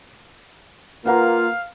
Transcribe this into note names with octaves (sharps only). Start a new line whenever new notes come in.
A#3 F4 B4 F5 F#5 A#5